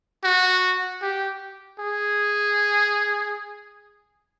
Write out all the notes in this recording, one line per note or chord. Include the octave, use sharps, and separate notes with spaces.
F#4
G4
G#4